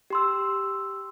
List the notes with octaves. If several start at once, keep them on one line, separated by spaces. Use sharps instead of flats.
G4 C6 E6